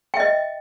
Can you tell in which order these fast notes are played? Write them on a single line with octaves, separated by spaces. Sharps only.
G5 E5 D#5